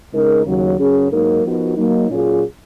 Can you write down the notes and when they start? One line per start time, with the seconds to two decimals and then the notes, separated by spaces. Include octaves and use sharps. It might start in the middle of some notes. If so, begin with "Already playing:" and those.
0.12 C#3 G#3 D#4 A#4
0.45 D#2 C#3 F#3
0.78 F#2 C#3 F#3 C#4 G#4
1.11 G#2 F#3 A#3 D#4 A#4
1.44 F3 B3 D#4 F#4 A#4
1.77 F#3 A#3 D#4
2.10 A#2 F#3 C#4 F4 G#4